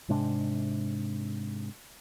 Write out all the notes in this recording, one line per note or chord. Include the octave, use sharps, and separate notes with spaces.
G#2 C3 G#3 D4